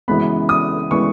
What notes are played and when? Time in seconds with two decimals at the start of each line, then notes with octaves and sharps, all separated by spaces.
0.08 F#2 C#3 E3 G#3 B3 B5
0.49 D#6
0.91 C#3 E3 G#3 B3 C#6